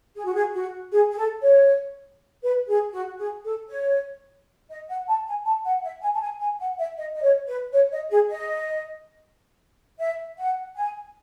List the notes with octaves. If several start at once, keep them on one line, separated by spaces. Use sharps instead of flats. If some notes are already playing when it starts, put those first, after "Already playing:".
G#4
F#4
G#4
F#4
G#4
G#4
A4
C#5
B4
G#4
F#4
G#4
A4
C#5
D#5
F#5
A5
G#5
A5
F#5
E5
G#5
A5
G#5
G#5
F#5
E5
D#5
D#5
C#5
B4
C#5
D#5
G#4
D#5
E5
F#5
G#5